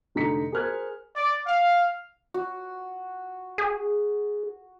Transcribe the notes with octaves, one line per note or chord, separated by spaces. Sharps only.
F1 D3 D#4 A#5 B6 C#7
G#4 A#4 C5 F6 F#6 G#6
D5
F5
F#4
G#4